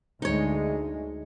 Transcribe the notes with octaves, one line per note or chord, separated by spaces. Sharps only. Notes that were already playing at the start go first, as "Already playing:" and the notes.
D2 G#3 D#4 C#5